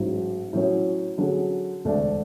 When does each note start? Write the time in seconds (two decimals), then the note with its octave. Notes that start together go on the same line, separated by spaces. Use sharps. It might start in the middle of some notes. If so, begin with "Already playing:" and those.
Already playing: A1 G#2 F#3
0.53 A2 F#3 C#4
1.18 D3 F#3 C#4 G#4
1.85 E1 D2 D3 A3 D4